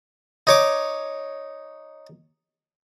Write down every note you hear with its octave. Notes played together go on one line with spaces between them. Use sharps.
D#4 C#5 D6